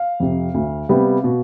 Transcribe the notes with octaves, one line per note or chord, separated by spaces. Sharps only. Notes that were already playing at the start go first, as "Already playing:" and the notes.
Already playing: F5
F2 C3
D2
C3 G3 B3
B2